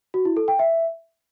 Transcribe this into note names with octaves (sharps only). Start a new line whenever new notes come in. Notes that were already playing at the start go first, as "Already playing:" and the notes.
F#4
E4
A4
G5
E5